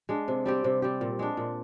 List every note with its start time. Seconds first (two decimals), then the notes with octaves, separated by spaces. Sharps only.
0.09 G#3 D4
0.28 C3
0.46 G3 C4 G4
0.64 C3
0.82 G3 C4 G4
1.01 A#2
1.19 G#3 D4
1.37 A#2